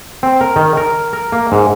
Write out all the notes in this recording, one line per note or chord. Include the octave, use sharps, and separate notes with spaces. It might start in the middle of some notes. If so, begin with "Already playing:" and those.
C4
A#4
D#3
A#4
A#4
A#3
G#2